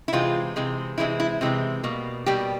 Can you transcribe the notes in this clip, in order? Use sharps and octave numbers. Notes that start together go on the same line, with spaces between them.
E4
C3 E3 G#3 C4 F4
C3 E3 G#3 C4
C3 E3 G#3 C4 E4
E4
C3 E3 G#3 C4
B2 G3 A#3
B2 G3 A#3 G4